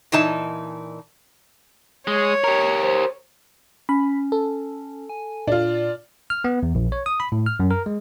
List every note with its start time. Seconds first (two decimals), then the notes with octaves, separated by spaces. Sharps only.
0.12 A#2 E3 D#4 A5
2.07 G#3 C#5
2.44 G4 A#4
2.83 C5
3.89 C#4 B5
4.32 A4
5.09 G#5
5.47 A#2 D4 F4
6.30 F6
6.44 B3
6.63 E2
6.75 A#1
6.92 C#5
7.06 D#6
7.20 B5
7.32 A2
7.46 F6
7.60 F#2
7.71 A#4
7.86 G#3